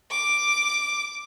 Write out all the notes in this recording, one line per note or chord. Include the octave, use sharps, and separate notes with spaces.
D6